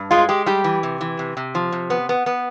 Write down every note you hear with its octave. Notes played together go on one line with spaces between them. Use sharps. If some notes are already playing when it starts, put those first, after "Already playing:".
Already playing: G2
G#3 F4
G#3 G4
G3 G4
E3
C3
E3
C3
C3
F3
C3
B3
B3
B3